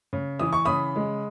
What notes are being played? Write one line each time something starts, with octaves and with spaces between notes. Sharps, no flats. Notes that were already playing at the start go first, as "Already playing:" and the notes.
C#3
E3 D#6
C#6
C#3 B5 D#6
G#3